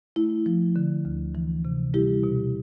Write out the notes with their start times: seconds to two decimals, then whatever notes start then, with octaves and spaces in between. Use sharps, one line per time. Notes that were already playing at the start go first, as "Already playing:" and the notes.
0.16 A3 E4
0.46 F3
0.76 D3
1.05 D2
1.35 E3
1.65 C3
1.94 G3 E4 G4
2.24 B2